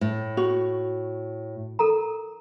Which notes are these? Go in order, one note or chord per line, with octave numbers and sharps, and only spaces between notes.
A2
F#4
A4 A#4 A#5